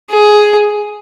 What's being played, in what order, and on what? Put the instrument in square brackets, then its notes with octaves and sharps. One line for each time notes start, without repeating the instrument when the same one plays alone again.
[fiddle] G#4